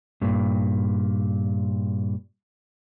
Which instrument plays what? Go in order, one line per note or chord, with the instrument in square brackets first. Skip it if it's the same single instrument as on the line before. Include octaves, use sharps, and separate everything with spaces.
[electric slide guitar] G2 A#2